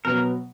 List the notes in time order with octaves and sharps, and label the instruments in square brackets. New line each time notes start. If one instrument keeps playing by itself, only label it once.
[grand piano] B2 F#3 B3 [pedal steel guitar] A#4